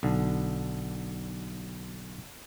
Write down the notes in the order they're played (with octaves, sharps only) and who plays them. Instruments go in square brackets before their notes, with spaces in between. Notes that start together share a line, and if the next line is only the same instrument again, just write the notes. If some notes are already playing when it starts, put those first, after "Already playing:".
[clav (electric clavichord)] B1 D3